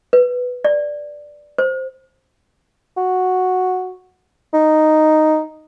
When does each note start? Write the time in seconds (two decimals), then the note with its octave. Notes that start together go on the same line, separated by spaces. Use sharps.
0.13 B4
0.64 D5
1.58 C5
2.97 F#4
4.54 D#4